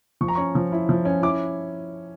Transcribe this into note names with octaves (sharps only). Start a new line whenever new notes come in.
F3 C#6
A#5
C#4 C#6
F3
E4
F3
C#4
E4 D6